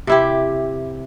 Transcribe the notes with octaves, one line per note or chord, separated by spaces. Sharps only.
C3 E4 G4